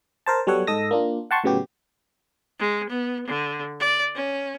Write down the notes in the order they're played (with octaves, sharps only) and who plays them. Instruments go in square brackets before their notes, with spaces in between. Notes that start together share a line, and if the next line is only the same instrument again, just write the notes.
[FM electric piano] A#4 C5 A5
F#3 G3 B3 A4 C#5 F#5
G#2 A4 D#5 D#6 E6 A#6
A#3 D4 F4
F#5 G5 A5 C6 C#6
A2 C#3 F#3 B3 F#4 G4
[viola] G#3
B3
D3
D5
C#4